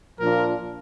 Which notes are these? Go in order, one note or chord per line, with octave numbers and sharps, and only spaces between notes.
A#2 F3 D4 F4 A#4